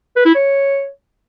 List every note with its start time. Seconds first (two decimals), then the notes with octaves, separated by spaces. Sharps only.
0.16 B4
0.26 E4
0.35 C#5